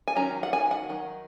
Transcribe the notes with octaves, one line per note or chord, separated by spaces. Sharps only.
G#5
D#3 F#3 C#4 A#5
F#5
G#5
F#5
D#3 F#3